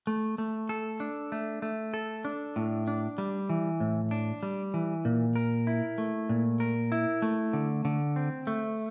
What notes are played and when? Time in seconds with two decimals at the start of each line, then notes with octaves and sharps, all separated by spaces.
0.07 A3
0.38 A3
0.69 A4
1.00 D4
1.32 A3
1.62 A3
1.94 A4
2.25 D4
2.56 A2
2.87 D4
3.18 G3
3.50 E3
3.80 A2
4.11 D4
4.43 G3
4.74 E3
5.05 A#2
5.36 A#4
5.67 E4
5.98 A3
6.29 A#2
6.60 A#4
6.92 E4
7.22 A3
7.53 D3
7.85 D3
8.16 C4
8.47 A3